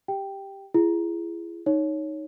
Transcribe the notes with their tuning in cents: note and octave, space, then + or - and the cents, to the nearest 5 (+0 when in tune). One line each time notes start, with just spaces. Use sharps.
G4 +0 G5 +0
E4 +40 G#4 +0
D#4 +0 C#5 +0